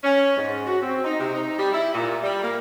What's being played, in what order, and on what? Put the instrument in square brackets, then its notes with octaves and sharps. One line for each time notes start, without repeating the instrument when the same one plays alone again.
[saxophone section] C#4
G#2
F#4
C4
D#4
C3
D#4
G3
E4
A#2
G3
A#3